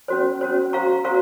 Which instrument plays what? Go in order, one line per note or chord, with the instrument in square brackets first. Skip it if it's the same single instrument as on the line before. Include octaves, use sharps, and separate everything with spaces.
[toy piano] C#4 F#4 C5
C#4 F#4 C5
F#4 C5 F5 A#5 C#6
F#4 C5 F5 A#5 C#6